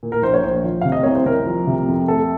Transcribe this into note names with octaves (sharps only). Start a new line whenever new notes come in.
A#2
A#4
A#1 C5
C#5
A#1 C5
F3
C3 F5
D#5
C2 C#5
C5
C2 A#4
F3
C3
F2
A3 A4